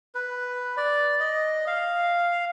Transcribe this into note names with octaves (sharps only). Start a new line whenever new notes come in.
B4
D5
D#5
F5